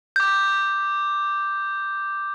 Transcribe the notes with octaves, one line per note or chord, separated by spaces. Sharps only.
D6 G6